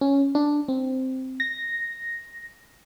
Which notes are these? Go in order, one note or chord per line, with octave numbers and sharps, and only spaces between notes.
C#4
D4
C4
A#6